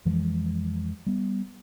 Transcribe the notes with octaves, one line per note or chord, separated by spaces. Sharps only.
F2 E3 F3 G#3
G3 B3